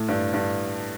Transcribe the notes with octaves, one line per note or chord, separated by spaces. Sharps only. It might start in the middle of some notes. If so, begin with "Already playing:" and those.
Already playing: A2
G2
G2